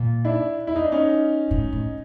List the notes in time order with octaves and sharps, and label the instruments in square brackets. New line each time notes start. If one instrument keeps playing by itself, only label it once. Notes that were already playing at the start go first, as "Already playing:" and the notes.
Already playing: [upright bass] A#2
[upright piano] D4 E4
E4
D#4
D4
C#4 D#4
[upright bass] A2
A2